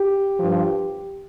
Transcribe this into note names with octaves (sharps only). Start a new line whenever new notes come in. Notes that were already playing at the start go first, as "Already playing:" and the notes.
Already playing: G4
G2 F3